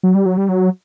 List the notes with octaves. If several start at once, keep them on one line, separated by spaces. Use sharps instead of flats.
F#3
G3
F#3
G3
F#3